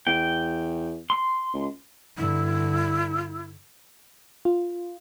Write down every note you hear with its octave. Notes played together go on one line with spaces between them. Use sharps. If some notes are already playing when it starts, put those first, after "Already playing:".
E2 G5
C6
C#2
G2 D3 E4
F4